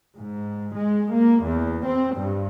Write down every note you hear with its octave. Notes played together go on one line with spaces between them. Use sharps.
G#2
G#3
A#3
E2
C4
G2